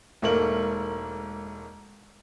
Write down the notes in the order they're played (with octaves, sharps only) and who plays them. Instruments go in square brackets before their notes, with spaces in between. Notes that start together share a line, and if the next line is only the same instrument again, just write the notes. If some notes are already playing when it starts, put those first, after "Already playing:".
[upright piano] E1 G#2 A3 A#3 A#4 F#7